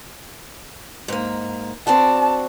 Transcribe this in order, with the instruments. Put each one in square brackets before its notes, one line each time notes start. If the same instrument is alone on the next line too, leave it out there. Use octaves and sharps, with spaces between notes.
[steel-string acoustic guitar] G#2 A#3
[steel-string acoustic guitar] C4 D4 F#4 [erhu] A5